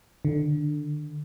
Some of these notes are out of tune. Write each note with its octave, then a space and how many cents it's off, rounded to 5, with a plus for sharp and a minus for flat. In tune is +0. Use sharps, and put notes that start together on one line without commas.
D3 +10